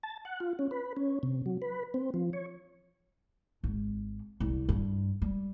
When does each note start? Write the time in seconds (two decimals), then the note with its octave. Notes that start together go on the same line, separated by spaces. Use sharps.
0.03 A5
0.25 F#5
0.40 F4
0.59 C#4
0.71 B4
0.97 C#4
1.23 C3
1.46 F#3
1.62 B4
1.94 C4
2.14 F3
2.33 C#5
3.64 G#1
4.40 C2
4.69 G2
5.22 G3